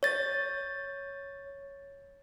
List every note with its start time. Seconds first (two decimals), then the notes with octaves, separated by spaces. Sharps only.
0.03 C#5 A6